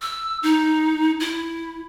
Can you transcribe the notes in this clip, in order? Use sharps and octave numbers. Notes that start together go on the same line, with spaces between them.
E6
D#4
E4